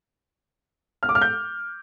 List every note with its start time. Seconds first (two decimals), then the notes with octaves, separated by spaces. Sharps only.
1.03 F6
1.09 D6
1.15 F6
1.21 G6